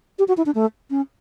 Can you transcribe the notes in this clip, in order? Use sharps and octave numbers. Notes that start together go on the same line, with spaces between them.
G4
F#4
E4
D4
A3
C#4